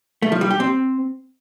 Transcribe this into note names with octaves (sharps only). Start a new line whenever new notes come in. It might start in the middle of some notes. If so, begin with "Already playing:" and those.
A3
F3
G3
G4
C4